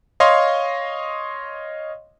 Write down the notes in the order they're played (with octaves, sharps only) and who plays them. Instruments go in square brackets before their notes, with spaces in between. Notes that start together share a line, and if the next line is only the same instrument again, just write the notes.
[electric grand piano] C#5 D#5 F5 C6